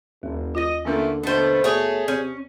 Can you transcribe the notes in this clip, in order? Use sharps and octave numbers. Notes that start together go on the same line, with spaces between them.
F#1 D#2
F4 D#5 A#6
D3 E3 A3 A#3 C#4 F4 A#4
B2 D3 A3 B3 A4 C5
B2 A3 G#4 C#5
C3 C#4 G6